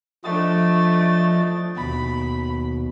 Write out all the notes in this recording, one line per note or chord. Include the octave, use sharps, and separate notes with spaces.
F3 A3 D4 D#5 A6
D#2 B2 B5